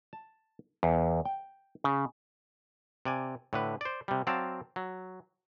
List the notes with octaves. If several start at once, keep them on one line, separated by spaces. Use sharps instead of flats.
A5
E2
G5
C#3
C3 D5 G#5
A2 D3 B4
C5 D5
C3 G3
F#3 C4 D5 F5 A5
F#3